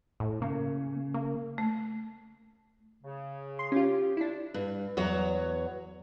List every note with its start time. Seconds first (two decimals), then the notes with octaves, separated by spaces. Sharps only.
0.20 A2
0.42 C#3 A#3
1.14 A#3
1.58 A3
3.02 C#3
3.59 C6
3.72 C#4 F4 G4
4.17 D4 E4
4.54 G2
4.97 E2 F#3 C#5 F#5